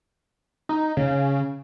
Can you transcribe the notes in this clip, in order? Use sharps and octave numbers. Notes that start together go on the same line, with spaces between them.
D#4
C#3